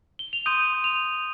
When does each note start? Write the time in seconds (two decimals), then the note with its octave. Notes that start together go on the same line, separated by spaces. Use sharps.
0.19 G7
0.33 F7
0.46 C6 D#6 G6 D#7
0.84 F7